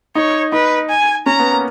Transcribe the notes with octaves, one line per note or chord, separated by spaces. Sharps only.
D#4 C#5
D#4 B4
G#5
C#4 A#5
B3
A#3